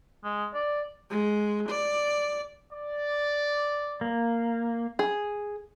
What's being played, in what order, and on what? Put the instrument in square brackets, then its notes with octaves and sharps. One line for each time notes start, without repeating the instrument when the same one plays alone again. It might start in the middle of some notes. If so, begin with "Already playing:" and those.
[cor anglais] G#3
D5
[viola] G#3
D5
[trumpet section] D5
[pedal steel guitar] A#3
[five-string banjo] G#4